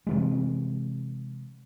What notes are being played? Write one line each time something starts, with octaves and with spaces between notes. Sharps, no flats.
C3 E3 G#3